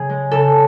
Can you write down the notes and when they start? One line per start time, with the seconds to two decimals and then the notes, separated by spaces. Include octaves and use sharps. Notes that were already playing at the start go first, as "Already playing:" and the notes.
Already playing: C#3 G#4
0.09 G#3
0.31 C#3 A4